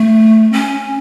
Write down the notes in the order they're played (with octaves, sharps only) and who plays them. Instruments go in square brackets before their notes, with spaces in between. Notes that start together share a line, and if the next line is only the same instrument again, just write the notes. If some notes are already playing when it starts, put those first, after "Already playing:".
Already playing: [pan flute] A3
C#4